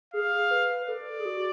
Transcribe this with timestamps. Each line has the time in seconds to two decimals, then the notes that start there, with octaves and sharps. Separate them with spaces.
0.14 G#4 F5
0.51 B4
0.83 B4
0.88 A4 D5
1.19 G#4
1.26 F#4